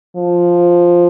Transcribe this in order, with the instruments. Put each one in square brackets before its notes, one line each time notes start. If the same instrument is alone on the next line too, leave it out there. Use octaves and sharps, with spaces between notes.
[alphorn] F3